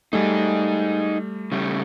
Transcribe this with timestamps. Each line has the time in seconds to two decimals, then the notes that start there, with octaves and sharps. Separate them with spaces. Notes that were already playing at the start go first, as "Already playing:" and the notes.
0.13 G3 A3 D#4 G#4
1.52 C#3 G3 A3